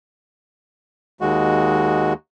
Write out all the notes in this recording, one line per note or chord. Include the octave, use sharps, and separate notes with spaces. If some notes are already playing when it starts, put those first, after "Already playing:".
D#2 G#3 F#4